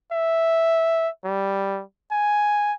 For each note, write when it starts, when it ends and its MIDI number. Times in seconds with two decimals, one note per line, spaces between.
0.12 1.09 76
1.25 1.82 55
2.12 2.73 80